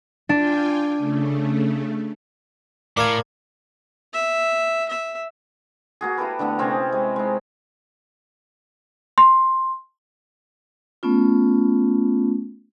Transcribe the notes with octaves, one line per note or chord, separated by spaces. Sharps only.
D4 F4 G5 G#5
C#3 A3
A2 A#4 D5 F5 G#5
E5
E5
A#3 F#4 G#4
E4 G4 A4 B4
D3 A3 B3 E4
C3 C4 C#4 G#4
G#3
G#3 D#4
C6
A3 B3 C#4 F4